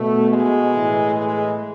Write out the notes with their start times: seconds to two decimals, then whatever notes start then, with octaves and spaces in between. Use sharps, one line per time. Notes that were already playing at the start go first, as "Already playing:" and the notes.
Already playing: B2 A3
0.30 G#3
0.73 A2 E3
1.16 G#3